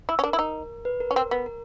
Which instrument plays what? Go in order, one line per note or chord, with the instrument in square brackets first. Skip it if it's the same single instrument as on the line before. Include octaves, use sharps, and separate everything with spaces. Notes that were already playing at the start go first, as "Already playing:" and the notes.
[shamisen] E4
C#4
[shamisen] D4 [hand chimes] A#4
[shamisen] E4
D#4
[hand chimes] B4
A#4
[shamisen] C#4
[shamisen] C4 [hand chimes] A#4
[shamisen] B3
[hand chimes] A#4